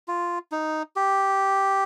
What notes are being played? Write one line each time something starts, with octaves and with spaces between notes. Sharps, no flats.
F4
D#4
G4